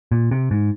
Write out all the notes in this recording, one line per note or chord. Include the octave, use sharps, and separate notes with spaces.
A#2
C3
G#2